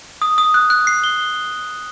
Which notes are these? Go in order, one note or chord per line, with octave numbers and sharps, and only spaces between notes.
D#6
D#6
F#6
F#6
C7
G7